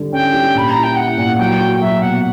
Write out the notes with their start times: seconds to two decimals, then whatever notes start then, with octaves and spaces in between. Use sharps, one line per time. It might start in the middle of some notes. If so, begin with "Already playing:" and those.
Already playing: D3 G3
0.13 C#4 G5
0.33 G3
0.55 A#2 B5
0.71 A#5
0.76 E4
0.84 G5
0.96 E4 F#5
1.18 A#2
1.38 F#3 G5
1.60 F#4
1.81 F#3 E5
2.02 B2 F#5